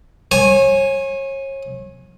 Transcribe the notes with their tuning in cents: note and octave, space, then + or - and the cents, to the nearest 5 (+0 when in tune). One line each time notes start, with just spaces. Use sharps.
C#5 -35 G#5 +0